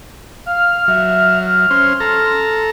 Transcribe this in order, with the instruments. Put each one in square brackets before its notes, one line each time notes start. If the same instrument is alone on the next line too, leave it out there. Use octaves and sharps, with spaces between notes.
[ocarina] F5 [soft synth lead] F6
[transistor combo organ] F#3 [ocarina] E5
[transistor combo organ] C#4 C5 [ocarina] C6
[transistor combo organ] A4 A#5